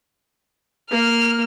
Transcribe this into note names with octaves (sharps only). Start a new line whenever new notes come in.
A#3 F6